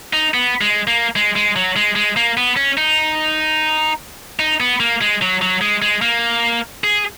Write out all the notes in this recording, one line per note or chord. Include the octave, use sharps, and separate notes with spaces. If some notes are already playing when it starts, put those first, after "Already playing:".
D#4
B3
G#3
A#3
G#3
G#3
F#3
G#3
G#3
A#3
B3
C#4
D#4
D#4
B3
A#3
G#3
F#3
F#3
G#3
G#3
A#3
G#4